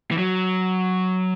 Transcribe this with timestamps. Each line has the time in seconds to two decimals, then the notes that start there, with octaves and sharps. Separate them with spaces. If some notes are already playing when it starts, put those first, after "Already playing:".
0.11 E3
0.18 F#3